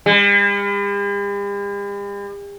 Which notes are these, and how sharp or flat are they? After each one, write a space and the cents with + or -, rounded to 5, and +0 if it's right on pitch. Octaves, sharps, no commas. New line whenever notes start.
G3 +45